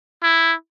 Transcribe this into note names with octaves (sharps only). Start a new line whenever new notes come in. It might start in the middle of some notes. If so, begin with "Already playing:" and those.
E4